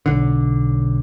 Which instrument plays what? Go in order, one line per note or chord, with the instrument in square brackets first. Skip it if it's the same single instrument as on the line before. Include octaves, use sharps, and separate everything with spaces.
[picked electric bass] B1 D3